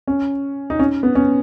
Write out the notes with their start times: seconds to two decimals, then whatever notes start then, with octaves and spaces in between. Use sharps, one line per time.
0.07 C#4
0.70 D#4
0.79 C#4
1.03 B3
1.15 C#4